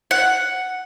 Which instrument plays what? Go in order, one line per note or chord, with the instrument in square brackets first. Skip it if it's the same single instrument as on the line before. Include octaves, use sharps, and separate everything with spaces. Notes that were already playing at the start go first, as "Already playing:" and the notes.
[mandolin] F#5